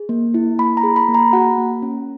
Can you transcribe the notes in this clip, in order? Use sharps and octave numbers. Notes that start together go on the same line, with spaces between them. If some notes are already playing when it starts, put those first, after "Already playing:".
Already playing: G#4
A#3
E4
A#3 B5
A#5
G#4
B5
A#3
A#5
F#4 F#5
A#3
C#4